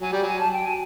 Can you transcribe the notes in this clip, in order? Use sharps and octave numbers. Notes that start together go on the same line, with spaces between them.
F#3 G#5
G3 G5
F#3 G#5
A5
G5
G#5